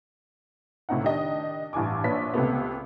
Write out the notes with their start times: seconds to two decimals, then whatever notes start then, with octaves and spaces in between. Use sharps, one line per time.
0.89 C#2 A2 C4 D#4 F#5
1.03 D#3 D4 G4 D#5
1.73 A1 G2 E3 G#5 D6
2.04 A#1 D4 B4 C#5 B6
2.34 C#2 C3 A3 B3